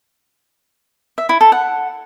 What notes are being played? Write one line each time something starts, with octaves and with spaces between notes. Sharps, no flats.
E5
E4
A4
F#5